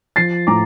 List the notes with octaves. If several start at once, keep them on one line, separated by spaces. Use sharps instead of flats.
F3 A6 C7
A2 A#5 D6